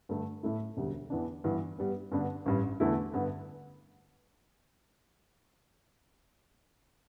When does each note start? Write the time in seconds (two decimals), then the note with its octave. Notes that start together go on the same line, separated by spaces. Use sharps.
0.09 G2 D3 A3
0.43 A2 A3 E4
0.77 E1 D2 D3 G3
1.10 E2 E3 B3 D4
1.44 G2 E3 B3
1.79 G2 G3 B3
2.12 G2 D3 B3 D4
2.46 A1 G2 G3
2.80 E2 D3 A3 E4
3.14 G2 D3 B3